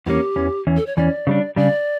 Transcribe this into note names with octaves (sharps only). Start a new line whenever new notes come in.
E2 E3 G3 A#3 C#4 G4
E2 E3 C#4
E2 E3 C#4
A4
C#5
E2 E3 C#4 D5
C#3 G3 D4
C#3 G3 D4 D5